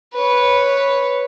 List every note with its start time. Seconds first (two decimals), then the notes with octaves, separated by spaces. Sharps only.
0.14 B4 C#5